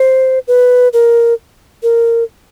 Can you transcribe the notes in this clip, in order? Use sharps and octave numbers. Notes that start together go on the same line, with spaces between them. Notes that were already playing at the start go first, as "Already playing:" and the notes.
Already playing: C5
B4
A#4
A#4